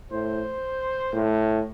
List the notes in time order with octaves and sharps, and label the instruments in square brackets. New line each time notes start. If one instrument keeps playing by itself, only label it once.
[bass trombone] A2 [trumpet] C5
[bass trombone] A2